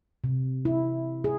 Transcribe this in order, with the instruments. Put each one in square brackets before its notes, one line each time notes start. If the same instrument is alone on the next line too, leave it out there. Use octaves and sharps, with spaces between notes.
[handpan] C3
E4
G#4